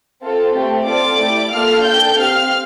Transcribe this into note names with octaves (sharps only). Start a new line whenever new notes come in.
C4 F4 A4
A3 C4 G4
C4 F4 A4 D5 D6
A3 E4 G4
A#3 F4 A4 F5 F6
D4 A4 G5 G6
C4 G4 F5 F6